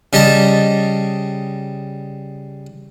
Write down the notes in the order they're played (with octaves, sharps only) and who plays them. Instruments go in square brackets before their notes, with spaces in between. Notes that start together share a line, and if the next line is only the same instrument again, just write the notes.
[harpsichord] C#3 G3 G4 D#5 A5